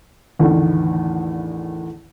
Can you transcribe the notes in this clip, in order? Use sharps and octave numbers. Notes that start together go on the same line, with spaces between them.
A1 E2 A2 D3 D#3